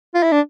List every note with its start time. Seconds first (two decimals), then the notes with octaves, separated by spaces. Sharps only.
0.14 F4
0.23 E4
0.31 D4